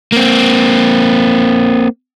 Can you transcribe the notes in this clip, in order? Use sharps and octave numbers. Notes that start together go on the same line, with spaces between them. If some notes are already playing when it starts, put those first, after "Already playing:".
A#3 C4